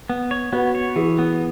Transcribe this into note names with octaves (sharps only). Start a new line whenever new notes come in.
B3
C#5
B3 F#4 B4
C#5
E3 E4 G#4
B3